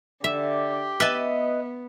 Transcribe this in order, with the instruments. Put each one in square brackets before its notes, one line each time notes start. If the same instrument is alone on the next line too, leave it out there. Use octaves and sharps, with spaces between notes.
[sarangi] D3 [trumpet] G4 [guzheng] E5
[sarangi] B3 [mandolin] B4 D#5 [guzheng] E5 A5